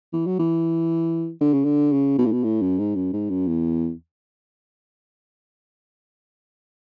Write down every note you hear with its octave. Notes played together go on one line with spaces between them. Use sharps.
E3
F#3
E3
D3
C#3
D3
C#3
B2
A2
B2
A2
F#2
G#2
F#2
G#2
F#2
E2